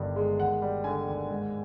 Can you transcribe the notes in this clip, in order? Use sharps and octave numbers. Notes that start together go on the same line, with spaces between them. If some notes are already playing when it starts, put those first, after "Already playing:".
Already playing: G1 G2 D#3
G#3
D#2 F#5
G3
D3 G#5
D#2
G#2